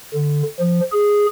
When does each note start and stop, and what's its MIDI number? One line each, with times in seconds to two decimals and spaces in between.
0.14 0.42 50
0.60 0.80 53
0.92 1.26 68